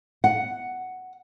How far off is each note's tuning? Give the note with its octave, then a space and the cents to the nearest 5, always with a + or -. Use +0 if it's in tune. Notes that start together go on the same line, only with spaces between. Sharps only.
F#5 +5